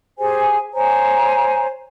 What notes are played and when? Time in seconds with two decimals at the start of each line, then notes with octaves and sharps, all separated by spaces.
0.18 G4 G#4 C5 G#5
0.74 C5 C#5 G#5 A#5